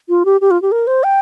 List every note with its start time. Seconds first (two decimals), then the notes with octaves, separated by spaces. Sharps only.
0.09 F4
0.25 G4
0.41 G4
0.51 F4
0.62 G4
0.72 A#4
0.87 C5
1.04 G5